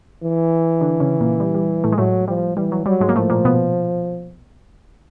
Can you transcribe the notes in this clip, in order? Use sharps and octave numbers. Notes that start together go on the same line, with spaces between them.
E3
D3 D4
C#3 C#4
A#2 A#3
G3
G3
A2 A3
G#3
A2 F#3 A3
F3 G3
E3 G3
F#3
F#3 G3
G#2 G#3
A#3
A2 F3 A3
A#2 A#3
B2 B3